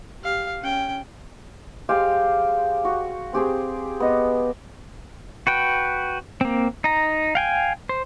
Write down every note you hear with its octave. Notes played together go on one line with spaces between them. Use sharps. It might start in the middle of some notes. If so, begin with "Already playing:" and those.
G4 F5
C#4 G5
G#3 G4 C5 F5
F#4
C4 G4 G#4 C5
B3 D#5
F#4 B4 G5
A#3 C4
D#4 A#5
F5 G5 G#5
C5